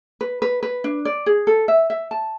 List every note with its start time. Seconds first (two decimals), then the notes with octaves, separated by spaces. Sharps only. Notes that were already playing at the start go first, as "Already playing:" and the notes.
0.21 B4
0.42 B4
0.63 B4
0.84 D4
1.05 D5
1.26 G#4
1.47 A4
1.68 E5
1.90 E5
2.11 A5